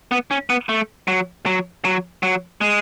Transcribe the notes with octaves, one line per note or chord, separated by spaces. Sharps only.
B3
C#4
B3
A3
F#3
F#3
F#3
F#3
G#3